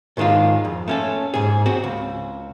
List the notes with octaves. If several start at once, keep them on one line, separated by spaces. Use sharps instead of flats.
G#2 D#3 G#3 D4 F4
F2
A3 C#4 A4
G#2 G#4
C4 F#4
C#2